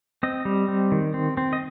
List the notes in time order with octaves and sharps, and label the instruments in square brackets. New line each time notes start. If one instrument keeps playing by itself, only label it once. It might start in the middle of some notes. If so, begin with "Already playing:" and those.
[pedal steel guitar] C4 D#5
G3
C4
D#3
C4
C4
D#5